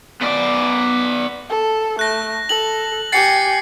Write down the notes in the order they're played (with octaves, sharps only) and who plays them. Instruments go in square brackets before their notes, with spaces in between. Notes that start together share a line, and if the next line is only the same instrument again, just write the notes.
[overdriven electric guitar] B3 D5
[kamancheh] A4
[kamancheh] A3 [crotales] F#6 A#6
[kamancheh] A4 [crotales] F#7
[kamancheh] G4 G#5 [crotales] A6 C7 C#7